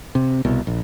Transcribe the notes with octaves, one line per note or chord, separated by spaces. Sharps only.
C3
C2 B2
A#1